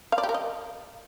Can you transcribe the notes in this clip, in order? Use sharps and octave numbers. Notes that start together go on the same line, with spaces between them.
F5
D5
G4
A#4
D#5